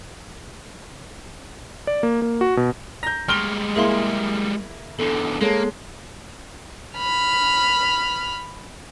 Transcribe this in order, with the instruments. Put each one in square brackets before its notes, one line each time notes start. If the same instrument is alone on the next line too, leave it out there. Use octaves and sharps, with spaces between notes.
[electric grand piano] D5
A#3
A#3
F#4
B2
[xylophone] A#5 [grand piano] G6 A#6
[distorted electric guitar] G3 G#3 [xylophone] C6 C#6 D7 [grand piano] F6 G7
[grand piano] A#3 E4 [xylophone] G#4 F5 C6
[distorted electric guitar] E2 D3 [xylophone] A4
[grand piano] G#3 [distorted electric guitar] A#3 [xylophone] A4 C#5 A5
[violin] B5 F6